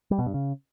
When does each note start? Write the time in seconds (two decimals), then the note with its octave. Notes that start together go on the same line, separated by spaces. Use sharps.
0.11 G3
0.19 B2
0.26 G2
0.34 C#3